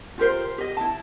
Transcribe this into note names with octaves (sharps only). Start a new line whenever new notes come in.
F4 G4 A#4 C5
G4 D#5
E4 A5